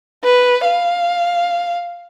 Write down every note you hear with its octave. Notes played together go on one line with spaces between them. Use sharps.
B4
F5